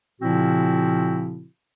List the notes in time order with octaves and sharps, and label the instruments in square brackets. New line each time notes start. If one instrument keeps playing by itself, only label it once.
[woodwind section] A#2 C#3 F3 C4 E4 F#4